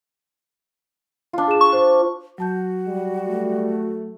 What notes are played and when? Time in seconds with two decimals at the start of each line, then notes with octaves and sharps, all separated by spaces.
1.33 D4 F4
1.48 G#4 E7
1.61 C#6
1.73 C5
2.38 F#3 F#4 A5 G6
2.88 G3
3.28 A3